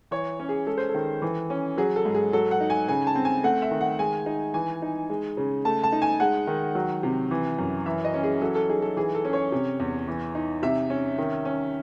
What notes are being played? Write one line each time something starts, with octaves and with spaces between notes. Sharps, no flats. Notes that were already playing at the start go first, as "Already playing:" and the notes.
E3 C#5
C#4
G#4
G#3 A4
C5
A4
D#3
E3
C#4
F#3 G#4
A4
G#2
G#4
F#3 A4
F#5
D#4
G#5
C#3 G#5
A5
C4
G#5
A3 F#5
E5
D#3
F#5
G#3 G#5
D#4
E3 G#5
D#4
G#3
C#3
A3 A5
A5
D#4
G#5
G#3 F#5
D#3
F#3
C3
E3
F#2
E3 E5
D#5
C#4
G#4
F#3 A4
A4
D#4 G#4
A4
E3 G#4
A4
C#4
C#5
C3
E2
E3
D#4
C3 E5
C#4
D#3
C#4